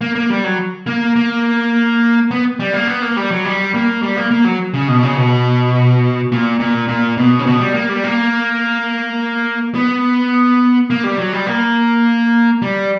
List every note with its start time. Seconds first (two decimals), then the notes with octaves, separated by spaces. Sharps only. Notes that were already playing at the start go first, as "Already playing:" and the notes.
0.01 A#3
0.15 A#3
0.30 G3
0.44 F#3
0.87 A#3
1.16 A#3
2.31 B3
2.60 G3
2.73 A#3
2.87 B3
3.02 A#3
3.17 G3
3.30 F#3
3.45 G3
3.74 A#3
4.03 G3
4.17 A#3
4.31 A#3
4.45 F#3
4.74 C#3
4.88 B2
5.03 C#3
5.17 B2
6.32 A#2
6.60 A#2
6.88 A#2
7.17 B2
7.39 C#3
7.46 B2
7.60 G3
7.74 A#3
7.89 G3
8.04 A#3
9.75 B3
10.90 A#3
11.04 G3
11.18 F#3
11.32 G3
11.46 A#3
12.62 G3